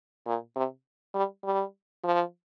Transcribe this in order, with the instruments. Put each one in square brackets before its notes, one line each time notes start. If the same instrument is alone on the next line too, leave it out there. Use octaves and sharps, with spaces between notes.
[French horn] A#2
C3
G3
G3
F3